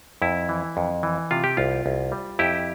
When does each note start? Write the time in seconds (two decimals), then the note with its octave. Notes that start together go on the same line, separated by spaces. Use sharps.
0.22 F2 E4
0.49 E3
0.77 F2
1.03 E3
1.31 C3 F4
1.44 G4
1.57 C2 F4
1.86 C2
2.12 G3
2.39 F2 E4 G4